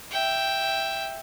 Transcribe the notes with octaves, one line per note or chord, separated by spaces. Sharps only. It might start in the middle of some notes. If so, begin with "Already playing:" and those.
E5 G5